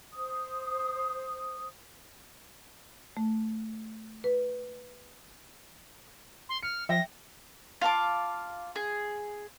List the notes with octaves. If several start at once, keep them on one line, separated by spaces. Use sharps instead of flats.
C5 D#6
A3
B4
C6
F6 C#7
F3 E5 G5 A#6
F4 F5 A5 D6
G#4